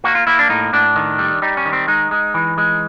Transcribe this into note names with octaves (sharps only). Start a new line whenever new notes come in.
A#3 F#4
F4
A#3 E4
D4
A2 D#4
A2 D4
D#3
G3
G3 D#4
C#4
D#3
C4
G#3 D#4
G#3
E3
G#3